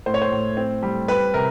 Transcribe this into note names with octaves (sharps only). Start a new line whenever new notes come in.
A2 C5
C#5
C5
A2
C4
G3
G3 B4
C3 A#4